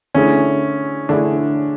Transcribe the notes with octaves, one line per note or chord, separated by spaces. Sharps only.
D3 A3 C#4 E4 G#4
D3 A3 D4 E4 G#4